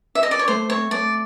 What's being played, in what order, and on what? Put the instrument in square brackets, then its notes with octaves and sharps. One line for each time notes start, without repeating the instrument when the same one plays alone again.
[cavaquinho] E5
D#5
D5
C#5
[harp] A3 [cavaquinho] C5
[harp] C4 [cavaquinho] C#5
[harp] A3 [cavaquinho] D5